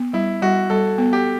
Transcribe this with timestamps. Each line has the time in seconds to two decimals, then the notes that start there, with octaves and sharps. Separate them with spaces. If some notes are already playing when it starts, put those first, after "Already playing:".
Already playing: B3
0.13 G3 E4
0.42 G3 F#4
0.70 G3 A4
0.98 B3
1.13 G4